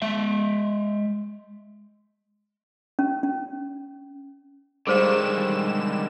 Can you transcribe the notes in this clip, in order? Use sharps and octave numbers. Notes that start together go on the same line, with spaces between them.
G#3 E5
C#4
C#4
D3 D#3 G3 G#3 G#4 C5 F5 E7